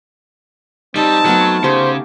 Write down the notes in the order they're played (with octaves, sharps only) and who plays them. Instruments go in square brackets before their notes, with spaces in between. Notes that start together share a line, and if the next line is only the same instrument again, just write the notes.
[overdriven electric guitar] G3 [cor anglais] C4 [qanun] D#4 D#5 [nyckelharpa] A5
[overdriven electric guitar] F#3 [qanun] A3 B3 A#4
[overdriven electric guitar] C#3 [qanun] G4 [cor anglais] C5